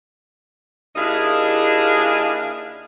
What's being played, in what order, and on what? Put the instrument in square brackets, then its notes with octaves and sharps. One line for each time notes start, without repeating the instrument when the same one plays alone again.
[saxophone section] D#2 D4 E4 G#4 D#5 F5